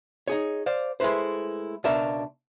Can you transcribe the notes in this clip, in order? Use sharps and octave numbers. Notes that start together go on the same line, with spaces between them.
D#4 G#4 C#5
C5 D5 F5
G#3 A3 E4 B4 C5
C#2 B2 D4 A#4 E5